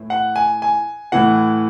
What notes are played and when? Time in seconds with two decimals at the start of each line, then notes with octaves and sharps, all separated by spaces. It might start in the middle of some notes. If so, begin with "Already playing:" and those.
Already playing: A2 E3
0.10 F#5
0.36 G#5
0.62 G#5
1.12 A2 E3 F#5